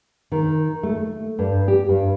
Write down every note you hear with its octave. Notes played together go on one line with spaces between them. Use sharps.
D#3
A3
G2
G4
G2